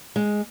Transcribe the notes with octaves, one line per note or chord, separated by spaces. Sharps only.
G#3